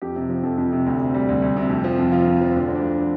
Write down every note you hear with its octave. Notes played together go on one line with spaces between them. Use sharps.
F2 G4
C3
F3
F2 A4
F2
C3
D2
C3
G3
D2
D2
C3
F2
F3
F2
F3 F4
F2
F3 C4
D2 D4
D3 C4
D4
F3